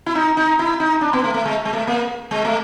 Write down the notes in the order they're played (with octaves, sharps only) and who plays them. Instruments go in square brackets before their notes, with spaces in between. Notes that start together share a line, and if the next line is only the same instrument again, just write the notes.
[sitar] E4
D#4
D#4
E4
D#4
D4
B3
A3
A3
G#3
G#3
A3
A#3
G#3
A3